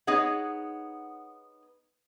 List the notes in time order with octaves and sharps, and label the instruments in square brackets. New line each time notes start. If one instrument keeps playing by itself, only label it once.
[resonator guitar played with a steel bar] B3 D#4 G#4 C#5 F#5